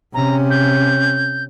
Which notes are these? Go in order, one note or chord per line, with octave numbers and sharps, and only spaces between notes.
C3 C#4 A#5
G6